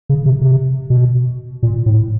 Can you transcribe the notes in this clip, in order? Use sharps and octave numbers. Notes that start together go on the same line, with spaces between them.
C#3
C3
C3
B2
A#2
A2